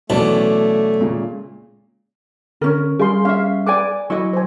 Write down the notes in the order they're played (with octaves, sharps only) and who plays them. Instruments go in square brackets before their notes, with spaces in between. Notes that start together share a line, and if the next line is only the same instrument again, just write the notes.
[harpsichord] B1 B2 E3 [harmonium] A3 [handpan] C#4 C#5 D5 [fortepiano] A5
[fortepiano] A#2 C#3 [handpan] G#3
[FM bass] D3 [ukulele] C#4 A#4
[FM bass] G3 [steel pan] G#4 F5 C6
[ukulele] C#4 E5 [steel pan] F5
[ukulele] B4 D5 G#5 [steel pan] D6
[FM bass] F#3 [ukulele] E4 D#5 [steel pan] C#6
[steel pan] C5 G#5